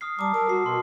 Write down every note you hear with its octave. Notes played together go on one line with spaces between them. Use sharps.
D#6 F6 C7
G3 A5 A#5 D6
A#4 A5 E6
F#4 C7
B2 C6